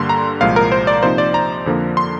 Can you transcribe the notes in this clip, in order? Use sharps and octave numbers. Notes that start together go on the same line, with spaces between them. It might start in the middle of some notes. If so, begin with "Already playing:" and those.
Already playing: G2 D3 G3 A#3 C6
A#5
C2 A#2 F3 G#3 F5
A#4
C5
D5
C3 F3 A#3 D#4 C5
D5
A#5
F2 D3 F3 A#3
C6